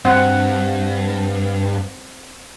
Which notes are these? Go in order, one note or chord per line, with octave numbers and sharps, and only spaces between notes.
G2 C4 F#5